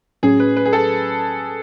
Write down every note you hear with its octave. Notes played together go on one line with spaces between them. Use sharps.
A2 F#3 C#4 G#4
B4
B4
G#4
A4